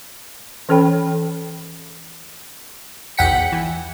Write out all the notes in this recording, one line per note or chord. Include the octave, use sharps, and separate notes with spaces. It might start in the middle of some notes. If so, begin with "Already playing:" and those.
E3 C#4 A4 C#5 G5 B5
B1 E2 F#5 G5 B6 C#7
E3